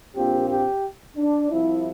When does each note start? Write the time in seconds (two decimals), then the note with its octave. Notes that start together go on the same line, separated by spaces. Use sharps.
0.15 A#1 A#2 F3 C4 G4
0.49 G4
1.16 D4
1.49 C2 C3 F3 E4